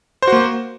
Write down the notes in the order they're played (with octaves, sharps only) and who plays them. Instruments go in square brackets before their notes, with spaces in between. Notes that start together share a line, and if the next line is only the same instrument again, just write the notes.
[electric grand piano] C5
F#4
A#3